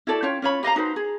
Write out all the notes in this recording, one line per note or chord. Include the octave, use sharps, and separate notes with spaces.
E4 F#4 A4 D5
C#4 F4 C#5 G5
C#4 F4 C#5 B5
G4 D#5 F5 A#5
D#4 F#4 B4 C5
G#4